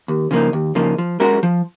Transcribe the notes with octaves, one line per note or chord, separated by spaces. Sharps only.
D#2
C#3 F3 A#3 D#4
D#2
C#3 F3 A#3 D#4
F3
G#3 C#4 F#4 A#4
F3